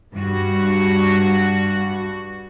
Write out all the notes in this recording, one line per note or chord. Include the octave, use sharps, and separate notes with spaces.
G2 F#4